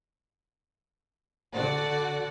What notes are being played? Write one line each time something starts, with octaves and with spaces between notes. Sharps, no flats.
D3 F#4 D5 F#5